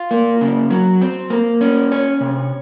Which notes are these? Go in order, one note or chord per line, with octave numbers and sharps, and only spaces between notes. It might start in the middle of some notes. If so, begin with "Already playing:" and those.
Already playing: F4
A#3
C#3
F#3
C4
A#3
C#4
C#5
C3